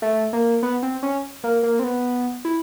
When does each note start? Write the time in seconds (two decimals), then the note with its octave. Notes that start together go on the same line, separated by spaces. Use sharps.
0.02 A3
0.33 A#3
0.63 B3
0.83 C4
1.03 C#4
1.44 A#3
1.63 A#3
1.79 C4
1.84 B3
2.45 E4